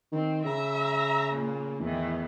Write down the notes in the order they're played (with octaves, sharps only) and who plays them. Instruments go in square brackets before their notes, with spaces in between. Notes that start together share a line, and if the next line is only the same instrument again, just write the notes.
[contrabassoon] D#3 [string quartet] C4
[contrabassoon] C#3 [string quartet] E5 A#5
[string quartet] A#2 A#3
[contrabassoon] E2 [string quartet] A2 D#3 E3